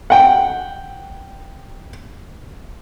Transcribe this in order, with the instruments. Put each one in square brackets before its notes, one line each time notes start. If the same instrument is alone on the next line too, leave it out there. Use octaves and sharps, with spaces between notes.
[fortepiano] F#5 G5